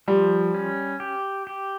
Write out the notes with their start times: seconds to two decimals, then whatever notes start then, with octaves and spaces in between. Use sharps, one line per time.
0.08 F3 G3
0.54 C#4
1.00 G4
1.47 G4